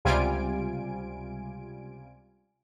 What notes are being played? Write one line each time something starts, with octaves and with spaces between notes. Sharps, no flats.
C#2 C3 G3 F4 G#5 D7